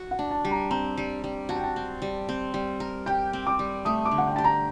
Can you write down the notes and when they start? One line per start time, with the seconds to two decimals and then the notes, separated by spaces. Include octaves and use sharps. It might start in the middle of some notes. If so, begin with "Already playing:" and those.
Already playing: F#4
0.11 F#5
0.19 D4
0.31 A5
0.45 G3
0.51 A#5
0.70 C4 A#5
0.97 G3
1.24 G3
1.49 F#4 A5
1.56 G5
1.64 A5
1.76 C4
2.02 G3
2.29 C4
2.54 G3
2.80 A#4
3.06 G4 G5
3.33 C4
3.47 D6
3.59 G3
3.85 A3 D#6
4.06 D6
4.11 D3
4.18 F#5
4.27 G5
4.36 G4 A5
4.44 A#5